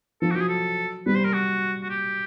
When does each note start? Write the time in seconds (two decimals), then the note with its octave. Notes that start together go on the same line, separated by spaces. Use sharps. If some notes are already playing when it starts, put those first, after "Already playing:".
0.22 F3 A4
0.31 F#4
0.35 F#3 G4
0.41 G#4
0.49 A4
1.06 G3 B4
1.16 C5
1.25 A#4
1.33 F#4
1.83 F#4
1.90 G4